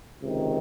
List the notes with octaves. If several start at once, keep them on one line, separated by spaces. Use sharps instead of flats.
C#2 C3 D#3